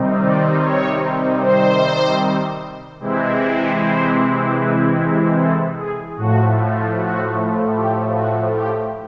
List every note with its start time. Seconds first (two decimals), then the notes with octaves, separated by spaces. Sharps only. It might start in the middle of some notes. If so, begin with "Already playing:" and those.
Already playing: C3 D#3 G3 C4 D#4
0.23 D5
0.63 C#5
1.41 C5
3.00 C3 E3 G#3 C4 E4
3.79 C5
4.59 B4
5.38 A4
5.78 G#4
6.16 A2 F3 A3 F#4
6.96 F#4
7.75 G4
8.15 F#4
8.55 G4